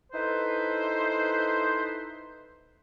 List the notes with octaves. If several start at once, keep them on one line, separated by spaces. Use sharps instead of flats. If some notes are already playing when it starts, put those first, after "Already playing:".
D#4 E4 A4 B4 C5